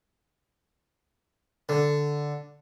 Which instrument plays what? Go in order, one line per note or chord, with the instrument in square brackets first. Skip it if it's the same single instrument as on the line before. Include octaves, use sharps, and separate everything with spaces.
[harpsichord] D3